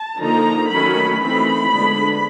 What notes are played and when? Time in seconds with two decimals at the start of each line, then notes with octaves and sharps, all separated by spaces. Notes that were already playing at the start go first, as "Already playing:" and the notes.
Already playing: A5
0.19 D3 F3 A#3 D#4 A#5
0.69 D#3 F#3 A3 C#4 B5
1.20 E3 A3 C4 D#4 B5
1.70 D3 F3 G#3 B3 D4